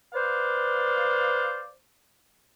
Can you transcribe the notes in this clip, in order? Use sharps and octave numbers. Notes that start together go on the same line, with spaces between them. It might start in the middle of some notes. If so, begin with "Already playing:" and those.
B4 C5 D5 F5